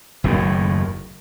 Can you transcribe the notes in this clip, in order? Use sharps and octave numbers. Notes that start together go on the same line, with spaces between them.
F#1 D#2 A2